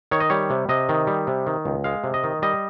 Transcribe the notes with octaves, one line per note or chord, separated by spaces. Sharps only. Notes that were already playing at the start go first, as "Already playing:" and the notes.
D#3 C#5
D#5
G3 C#5
C3
C3 D#5
D#3
G3
C3
D#3
C#2
G#3 F5
C3
D#5
D#3
G3 D#5